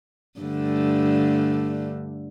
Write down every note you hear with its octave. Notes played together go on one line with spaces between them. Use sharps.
G2 D3 A3